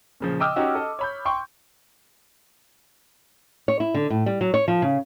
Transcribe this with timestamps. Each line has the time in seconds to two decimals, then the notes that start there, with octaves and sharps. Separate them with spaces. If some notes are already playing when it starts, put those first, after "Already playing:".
0.20 A#2 C#3 F3
0.40 D#5 G5 D6 E6 F6
0.56 C#4 D#4 F#4 G4
0.75 A4 D#5
0.99 C#5 B5 G6
1.25 G5 C6 C#6
3.68 C#5
3.80 E4
3.94 D3
4.10 A2
4.26 G3
4.41 F#3
4.54 C#5
4.68 F3
4.82 C#3